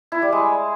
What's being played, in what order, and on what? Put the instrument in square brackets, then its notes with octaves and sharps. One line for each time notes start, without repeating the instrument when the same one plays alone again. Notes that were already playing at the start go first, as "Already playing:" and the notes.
[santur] E4
G3
G#3